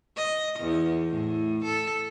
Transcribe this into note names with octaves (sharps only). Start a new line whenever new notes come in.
D#5
E2
A2
A4